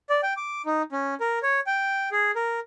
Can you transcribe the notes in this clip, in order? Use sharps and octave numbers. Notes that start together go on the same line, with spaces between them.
D5
G5
D6
D#4
C#4
A#4
C#5
G5
G#4
A#4